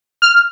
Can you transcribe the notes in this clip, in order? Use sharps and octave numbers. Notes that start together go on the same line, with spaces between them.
F6